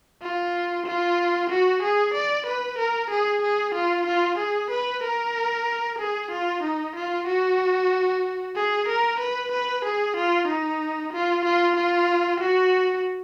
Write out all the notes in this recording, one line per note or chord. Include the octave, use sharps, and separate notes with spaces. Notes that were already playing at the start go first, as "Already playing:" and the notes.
F4
F4
F#4
G#4
D5
B4
A#4
G#4
G#4
F4
F4
G#4
B4
A#4
G#4
F4
D#4
F4
F#4
G#4
A#4
B4
B4
G#4
F4
D#4
F4
F4
F4
F#4